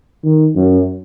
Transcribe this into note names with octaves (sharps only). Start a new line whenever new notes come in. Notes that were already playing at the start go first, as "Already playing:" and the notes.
D#3
F#2